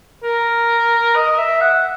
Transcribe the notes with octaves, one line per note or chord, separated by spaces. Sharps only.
A#4
D#5
E5
F#5